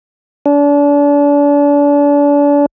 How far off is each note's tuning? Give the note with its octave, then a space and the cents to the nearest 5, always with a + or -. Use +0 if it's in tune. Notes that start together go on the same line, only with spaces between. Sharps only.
D4 -35